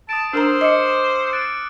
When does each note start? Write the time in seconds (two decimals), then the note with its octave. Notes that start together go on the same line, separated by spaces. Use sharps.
0.09 A5 D#6 D7
0.33 D4 A#4 C5 A#5 E6 F6 D7
0.61 D#5 D6 C#7
1.33 F#6 A6 D7